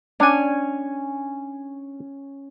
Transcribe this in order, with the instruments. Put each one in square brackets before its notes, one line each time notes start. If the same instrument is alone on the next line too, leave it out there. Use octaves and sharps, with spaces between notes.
[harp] C#4 G#5 [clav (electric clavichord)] D4